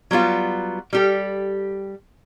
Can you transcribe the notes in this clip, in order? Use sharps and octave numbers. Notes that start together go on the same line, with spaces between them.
F#3 G3 B3 F4
G3 G4 A4